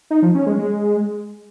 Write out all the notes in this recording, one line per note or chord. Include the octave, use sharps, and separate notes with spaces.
D#4
F3
C#4
G#3
G#3